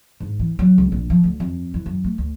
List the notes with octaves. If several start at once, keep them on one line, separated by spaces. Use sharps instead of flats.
G#2
E3
F#3
C#2
A#1
F3
D2
F2
E3
F#2
A3
D2